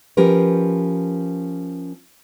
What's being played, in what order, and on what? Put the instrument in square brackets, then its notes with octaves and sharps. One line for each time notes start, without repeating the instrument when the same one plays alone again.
[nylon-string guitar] F3 C#4 G4 A#4 B4